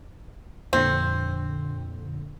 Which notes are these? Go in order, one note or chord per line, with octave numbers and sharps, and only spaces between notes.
F2 A#2 D3 C4